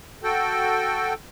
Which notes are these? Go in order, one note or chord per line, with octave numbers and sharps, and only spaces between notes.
F#4 A4 G5